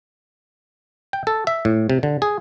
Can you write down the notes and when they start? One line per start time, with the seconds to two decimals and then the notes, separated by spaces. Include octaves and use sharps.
1.13 G5
1.27 A4
1.47 E5
1.65 A2
1.90 C3
2.03 D3
2.22 G#4